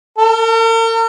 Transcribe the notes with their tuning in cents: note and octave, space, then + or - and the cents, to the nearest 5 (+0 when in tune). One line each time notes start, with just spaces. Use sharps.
A#4 -45